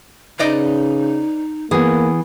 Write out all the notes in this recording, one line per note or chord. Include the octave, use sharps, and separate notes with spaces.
C#3 D#4 B4 D5 D#5
E3 A#3 B3 G#4